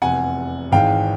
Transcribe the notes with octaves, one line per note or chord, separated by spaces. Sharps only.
F1 E2 C3 F#5 G#5
G#1 G#2 E3 G#3 F5 G5